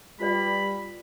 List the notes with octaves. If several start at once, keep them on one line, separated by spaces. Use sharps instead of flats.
G3 F4 B4 D5 B5